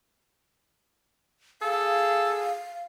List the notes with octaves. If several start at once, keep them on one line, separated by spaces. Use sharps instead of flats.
G#4 A4 F5